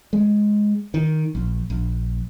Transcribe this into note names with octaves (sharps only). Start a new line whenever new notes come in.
G#3
D#3
A#1
A#1